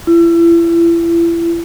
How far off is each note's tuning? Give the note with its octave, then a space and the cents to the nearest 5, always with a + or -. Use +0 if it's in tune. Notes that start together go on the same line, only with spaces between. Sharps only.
E4 +35